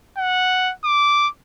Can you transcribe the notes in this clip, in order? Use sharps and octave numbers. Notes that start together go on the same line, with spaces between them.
F#5
D6